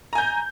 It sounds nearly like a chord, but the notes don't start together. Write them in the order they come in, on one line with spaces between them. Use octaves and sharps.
A#5 G#5 G6